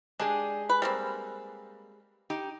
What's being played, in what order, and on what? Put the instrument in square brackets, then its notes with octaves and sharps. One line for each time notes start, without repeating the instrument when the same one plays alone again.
[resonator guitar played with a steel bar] G#3 G4 G#4 [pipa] D4
[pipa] B4
G3 A#3 C4
[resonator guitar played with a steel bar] D#4 G4